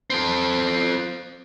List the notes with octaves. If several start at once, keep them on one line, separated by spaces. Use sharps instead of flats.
C4 A4